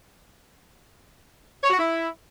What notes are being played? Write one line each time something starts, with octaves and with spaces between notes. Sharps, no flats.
C#5
F#4
E4